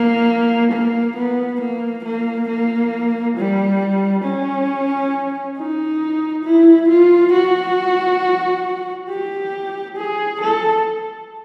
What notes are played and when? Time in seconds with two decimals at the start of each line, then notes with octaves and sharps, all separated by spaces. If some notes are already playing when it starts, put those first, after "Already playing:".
Already playing: A#3
0.72 A#3
1.17 B3
1.61 A#3
2.05 A#3
2.49 A#3
3.37 G3
4.24 C#4
5.57 D#4
6.45 E4
6.89 F4
7.33 F#4
9.09 G4
9.97 G#4
10.41 A4